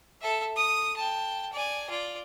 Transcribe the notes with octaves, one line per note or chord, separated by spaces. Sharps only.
A4 E5
D#6
G5 A5
D5 G#5
F4 D5